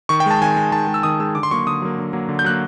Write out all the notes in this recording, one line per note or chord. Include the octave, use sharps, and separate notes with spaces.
D#3 C#6
G5
G#3 A5
D#3 G#5
G#3
D#3 A5
G#3
E6
D#3 D#6
G#3 E6
D3 D6
C6
F#3 A#3 C#6
D3 D#6
F#3 A#3
D3
F#3 A#3
D3
G6
F#3 A#3 F#6